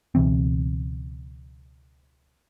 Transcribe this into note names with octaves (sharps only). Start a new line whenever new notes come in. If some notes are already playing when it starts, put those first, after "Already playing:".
C#2 B2 E3 C4